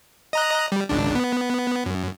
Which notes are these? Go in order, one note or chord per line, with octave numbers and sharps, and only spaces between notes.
D#5 A#5 F#6
G3
G#1 C#2 D4
B3
F#2